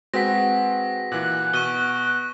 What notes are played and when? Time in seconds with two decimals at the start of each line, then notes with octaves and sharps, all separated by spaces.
0.14 G#3 C4 F#4 B4 F#5 A#6 B6
1.12 A#2 E3 F#6
1.53 B2 C#6 D#7 G7